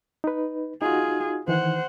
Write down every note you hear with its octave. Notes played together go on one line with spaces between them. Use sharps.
D#4 B4
D#4 F4 F#4 G#4
D#3 E3 C5 F#5